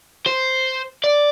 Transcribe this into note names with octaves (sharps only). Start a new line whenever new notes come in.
C5
D5